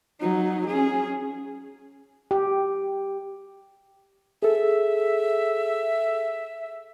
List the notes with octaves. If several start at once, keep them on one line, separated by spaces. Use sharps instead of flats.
F#3 D#4
C#4 G#4
G4
G#4 A4 E5